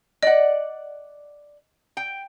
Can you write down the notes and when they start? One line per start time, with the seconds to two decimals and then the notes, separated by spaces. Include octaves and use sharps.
0.23 D5 D#5 F#5
1.97 G5